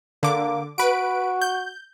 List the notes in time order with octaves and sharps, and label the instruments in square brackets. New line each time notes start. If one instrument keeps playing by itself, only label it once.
[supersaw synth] D3 D6 [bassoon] A#3
[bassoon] F#4 [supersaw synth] B4 D7
[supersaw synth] G6